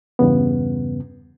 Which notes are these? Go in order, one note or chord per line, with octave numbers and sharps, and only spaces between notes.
E2 G2 C#3 B3